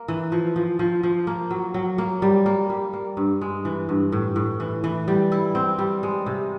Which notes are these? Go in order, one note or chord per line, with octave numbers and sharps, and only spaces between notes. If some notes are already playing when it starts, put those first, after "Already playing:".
Already playing: A#3
E3
F3
F3
F3
F3
A#3
F#3
F#3
A#3
G3
A#3
G3
A#3
G2
G#3
E3
G2
A2
A2
E3
E3
G3
E4
C4
G3
G#3
C3